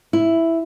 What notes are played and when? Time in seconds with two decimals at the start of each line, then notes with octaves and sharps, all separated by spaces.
0.13 E4